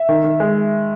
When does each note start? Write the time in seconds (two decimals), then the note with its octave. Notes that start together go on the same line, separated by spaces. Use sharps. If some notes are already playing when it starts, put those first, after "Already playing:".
Already playing: E5
0.09 D#3
0.24 D#3
0.40 G#3